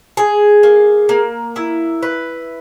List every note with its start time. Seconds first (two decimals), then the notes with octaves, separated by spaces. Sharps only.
0.17 G#4
0.63 A#3
1.09 A#3
1.56 E4
2.03 B4